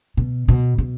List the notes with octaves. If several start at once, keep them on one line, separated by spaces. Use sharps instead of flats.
B2
B2
B2